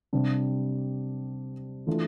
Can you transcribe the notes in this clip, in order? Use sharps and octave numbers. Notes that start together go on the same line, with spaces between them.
C3 G3 D4
E3 A3 D4 F4